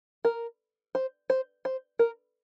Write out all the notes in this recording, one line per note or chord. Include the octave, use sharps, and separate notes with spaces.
A#4
C5
C5
C5
A#4